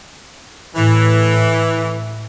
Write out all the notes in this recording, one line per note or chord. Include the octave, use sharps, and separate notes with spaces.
A2 E3